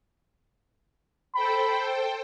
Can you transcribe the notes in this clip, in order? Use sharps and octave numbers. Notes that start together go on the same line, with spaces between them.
A4 C5 G5 B5